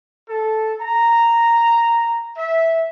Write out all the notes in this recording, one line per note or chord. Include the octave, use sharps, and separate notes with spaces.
A4
A#5
E5